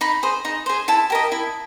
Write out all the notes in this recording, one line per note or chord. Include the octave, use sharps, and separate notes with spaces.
D#4 B5
G#4 C5
D#4
G#4 C5
E4 A5
G4 A#4 D#5
E4